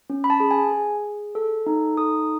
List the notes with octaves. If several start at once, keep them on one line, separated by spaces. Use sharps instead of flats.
C#4
B5
A5
G#4
G#5
G#4
G#4
A4
D#4
A4 D#6